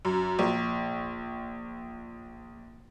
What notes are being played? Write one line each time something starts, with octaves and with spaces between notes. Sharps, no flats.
F#2
A#1